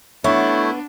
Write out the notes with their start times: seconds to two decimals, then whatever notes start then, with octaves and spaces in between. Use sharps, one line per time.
0.24 A3 B3 D4 E4 C#5 E5 C#6